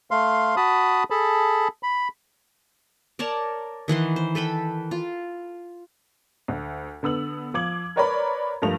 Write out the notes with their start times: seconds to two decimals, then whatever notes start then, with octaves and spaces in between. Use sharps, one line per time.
0.11 A3 F5 C6
0.56 F#4 A5 B5 D#6
1.10 G#4 A4 A5 B5
1.83 B5
3.19 A#4 C#5 D5 A5
3.88 D#3 E3 F#5 C6
4.16 C5
4.35 A4 B4 G5 B5
4.91 F4
6.48 D2
7.03 D3 B3 E6 F#7
7.54 F3 D6 G#6 F#7
7.96 A#4 B4 C#5 D5 A#5 B5
8.62 G2 F3 A3 A#4 F7